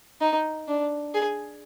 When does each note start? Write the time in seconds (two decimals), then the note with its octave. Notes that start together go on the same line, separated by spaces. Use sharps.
0.21 D#4
0.68 D4
1.14 G#4